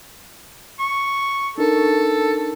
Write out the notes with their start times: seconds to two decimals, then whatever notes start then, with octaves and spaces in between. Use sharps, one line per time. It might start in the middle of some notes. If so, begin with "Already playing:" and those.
0.79 C#6
1.58 D4 D#4 A4 A#4